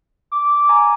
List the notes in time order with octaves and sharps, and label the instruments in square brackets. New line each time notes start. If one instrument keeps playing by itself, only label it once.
[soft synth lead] D6
[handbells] G#5 A#5